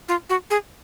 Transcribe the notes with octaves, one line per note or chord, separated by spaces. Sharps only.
F4
F#4
G#4